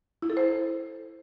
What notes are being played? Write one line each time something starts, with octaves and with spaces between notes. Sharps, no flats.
E4
A4
C5